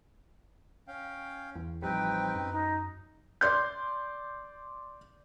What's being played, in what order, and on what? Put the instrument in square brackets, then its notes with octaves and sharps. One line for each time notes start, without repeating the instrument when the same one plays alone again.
[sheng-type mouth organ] C#4 F5 G5
[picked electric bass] E2
[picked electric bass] A1 F3 G3 [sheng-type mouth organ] C4 D#4 B4 [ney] G5
[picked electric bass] F#2
[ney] D#4
[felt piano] D5 C6 G6